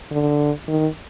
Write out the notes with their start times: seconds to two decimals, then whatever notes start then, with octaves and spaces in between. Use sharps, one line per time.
0.11 D3
0.68 D#3